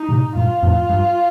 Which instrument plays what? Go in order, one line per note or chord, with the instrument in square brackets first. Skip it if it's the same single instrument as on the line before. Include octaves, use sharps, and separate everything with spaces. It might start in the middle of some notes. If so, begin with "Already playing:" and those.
Already playing: [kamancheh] D#4
[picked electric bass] A2 C3
[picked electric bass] G2 A#2 [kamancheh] F4
[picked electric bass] F2 A2
G2